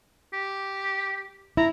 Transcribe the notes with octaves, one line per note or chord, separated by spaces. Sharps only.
G4
E4 A#5